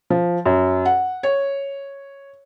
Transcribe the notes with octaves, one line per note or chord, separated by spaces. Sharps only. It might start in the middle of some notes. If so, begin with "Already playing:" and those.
F3
F#2
F#5
C#5